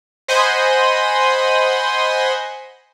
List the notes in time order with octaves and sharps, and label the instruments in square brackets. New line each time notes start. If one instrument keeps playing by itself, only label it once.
[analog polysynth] C5 D#5 F#5 G#5 B5 C6